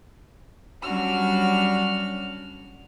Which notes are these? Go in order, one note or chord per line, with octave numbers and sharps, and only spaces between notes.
F#3 G3 C#4 D4 F#4 F6